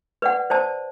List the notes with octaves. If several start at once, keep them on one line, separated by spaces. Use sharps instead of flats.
B4 D5 F#5
C5 D5 A5